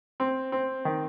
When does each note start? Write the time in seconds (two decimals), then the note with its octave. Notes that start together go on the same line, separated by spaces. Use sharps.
0.20 C4
0.52 C4
0.85 D#3